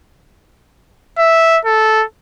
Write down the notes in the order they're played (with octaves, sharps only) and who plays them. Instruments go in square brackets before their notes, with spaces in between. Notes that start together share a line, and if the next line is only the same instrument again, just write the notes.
[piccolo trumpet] E5
A4